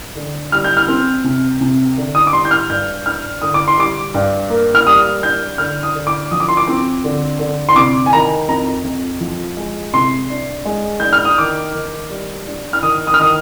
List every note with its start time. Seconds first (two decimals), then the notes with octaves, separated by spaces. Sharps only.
0.16 D3
0.52 G3 F6
0.64 G6
0.77 F6
0.88 C4
1.24 C3
1.61 C3
1.97 D3
2.15 D#6
2.27 D6
2.32 G3 C6
2.45 G6
2.51 F6
2.69 G2 G6
3.05 D4 F6
3.42 D3 D#6
3.54 D6
3.68 C6
3.78 G3 D6
4.14 G2
4.50 A#3
4.75 F6
4.86 G3 D#6
5.23 D4 G6
5.58 D3 F6
5.83 D#6
5.95 D3
6.07 D6
6.31 F3 D#6
6.40 D6
6.48 C6
6.57 D6
6.67 C4
7.04 D3
7.39 D3
7.69 C6
7.76 C3 D6
8.06 G#5
8.13 D#3 A#5
8.48 F2 A#5
8.84 F2
9.21 F3
9.57 G#3
9.94 C3 C6
10.30 D4
10.65 G#3
11.00 D4 G6
11.13 F6
11.25 D#6
11.38 D#3 D6
11.75 D#3
12.10 G3
12.47 D4
12.73 F6
12.83 D#3 D#6
13.07 D#6
13.14 F6
13.19 D#3 D#6